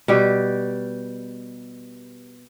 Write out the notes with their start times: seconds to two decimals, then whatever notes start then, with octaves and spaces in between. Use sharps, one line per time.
0.08 B2 G3 G4